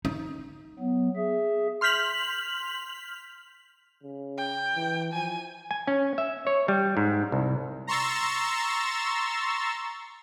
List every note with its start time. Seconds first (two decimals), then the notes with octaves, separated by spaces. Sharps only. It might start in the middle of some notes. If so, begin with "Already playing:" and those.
0.05 D#4
0.79 F#3 B3
1.16 G#4 E5
1.81 C6 F6 G6 B6 F7 F#7
4.03 C#3
4.37 G5
4.76 E3
5.13 F3 G#5
5.71 G#5
5.87 C#4
6.18 E5
6.47 C#5
6.68 G3
6.97 G#2
7.32 C2
7.87 A#5 C6 C#6 E6 A6